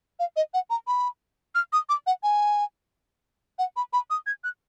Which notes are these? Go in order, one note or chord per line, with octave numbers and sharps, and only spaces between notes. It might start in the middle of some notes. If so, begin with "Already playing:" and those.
F5
D#5
F#5
A#5
B5
F6
D#6
D6
F#5
G#5
F#5
B5
B5
D#6
G#6
F#6